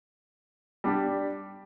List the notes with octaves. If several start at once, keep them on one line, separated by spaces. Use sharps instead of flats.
G3 D4 G4